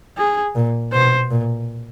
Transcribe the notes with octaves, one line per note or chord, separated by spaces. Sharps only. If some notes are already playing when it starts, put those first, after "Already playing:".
G#4
A#2
B2 C5
A#2